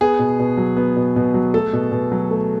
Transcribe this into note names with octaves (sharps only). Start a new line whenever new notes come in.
B3 G#4
B2
B2
F#3
B3
B2
B2
F#3
A3 A4
B2
B2
F#3
A3